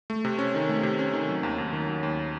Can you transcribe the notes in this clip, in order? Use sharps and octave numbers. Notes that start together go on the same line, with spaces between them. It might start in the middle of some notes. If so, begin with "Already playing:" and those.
A3
C3
C#4
D#3
A3
C3
C#4
D#3
F#3
D#2
D#2
D#3
F#3
D#2